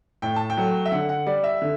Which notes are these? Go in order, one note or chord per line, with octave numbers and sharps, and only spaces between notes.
A2 G5
A5
G5
F#3 A3
E5
D3 F#5
F#5
G3 D5
E5
D3